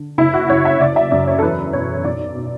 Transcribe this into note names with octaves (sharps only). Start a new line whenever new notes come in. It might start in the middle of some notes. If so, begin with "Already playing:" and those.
Already playing: D3
F#1 E4
F#4
F#2 C#5
E5
F#1 D5
E5
F#2 D5
C#5
A4
E2 B4
B2 C#5
B1 D5
B2